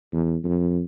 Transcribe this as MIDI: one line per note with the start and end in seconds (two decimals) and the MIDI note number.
0.13 0.37 40
0.44 0.83 41